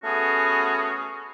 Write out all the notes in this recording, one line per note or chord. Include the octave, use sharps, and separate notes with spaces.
A3 B3 C#4 F#4 G#4